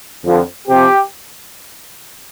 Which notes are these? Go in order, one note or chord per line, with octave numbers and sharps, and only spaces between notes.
F2 D3 F3 C4
C3 F3 C4 G4